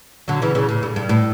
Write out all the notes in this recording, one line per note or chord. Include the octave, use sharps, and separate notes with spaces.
D3 F#3
C#3 E3
C#3 E3
A2
G2
G2
A2